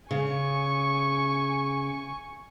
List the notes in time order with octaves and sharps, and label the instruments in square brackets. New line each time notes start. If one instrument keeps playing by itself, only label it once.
[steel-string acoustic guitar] C#3 [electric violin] G#5 C#6